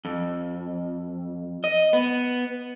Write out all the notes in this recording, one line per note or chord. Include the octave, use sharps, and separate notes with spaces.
F2
D#5
B3